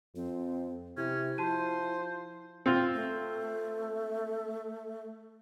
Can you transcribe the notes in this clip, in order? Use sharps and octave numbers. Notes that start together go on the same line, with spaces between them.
F2 C4
C3 C#4 E4
F3 F#4 C5 A5 D#7
C4 F4
A3